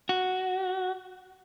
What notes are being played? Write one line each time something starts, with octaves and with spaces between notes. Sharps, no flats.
F#4